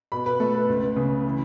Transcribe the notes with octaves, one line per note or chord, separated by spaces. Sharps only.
B2 B5
B4
A3 A4
B4
C#2
C#3
E3